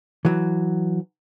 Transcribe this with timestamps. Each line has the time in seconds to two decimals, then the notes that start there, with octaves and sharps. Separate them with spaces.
0.25 E3 F#3